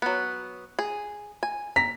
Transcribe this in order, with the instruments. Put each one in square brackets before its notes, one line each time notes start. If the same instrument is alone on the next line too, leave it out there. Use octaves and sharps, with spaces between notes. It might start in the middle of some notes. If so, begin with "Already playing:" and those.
[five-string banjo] F#3 B3
G#4
G#5
[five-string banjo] A#5 [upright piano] B6